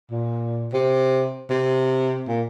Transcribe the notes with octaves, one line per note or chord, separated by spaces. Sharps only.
A#2
C3
C3
A#2